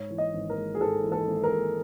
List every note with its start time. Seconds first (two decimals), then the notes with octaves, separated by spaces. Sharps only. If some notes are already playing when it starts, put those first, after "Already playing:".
Already playing: G#2 C#5
0.10 E3
0.18 D#5
0.34 G#1
0.50 A#4
0.57 G#3
0.75 G#4
0.81 G#2 A4
1.04 E3
1.12 A4
1.28 G#1
1.44 A#4
1.52 G#3